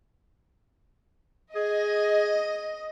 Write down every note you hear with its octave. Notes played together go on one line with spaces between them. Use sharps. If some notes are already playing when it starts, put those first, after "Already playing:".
G#4 D#5